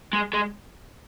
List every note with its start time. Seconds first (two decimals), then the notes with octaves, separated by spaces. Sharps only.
0.13 G#3
0.33 G#3